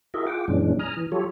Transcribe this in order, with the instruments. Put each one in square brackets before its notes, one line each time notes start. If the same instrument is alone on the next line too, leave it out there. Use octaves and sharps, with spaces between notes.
[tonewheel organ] E4 F#4 G#4 A#4 D#5 E5
F4 G#4 F#5 G5 D6
F#2 A#2 E3 G#3 C#4 D4
G#5 A#5 D#6 F6
E3
F#3 F4 G4 A4 C#5